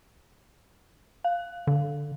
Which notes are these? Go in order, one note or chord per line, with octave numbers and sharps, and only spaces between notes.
F5
D3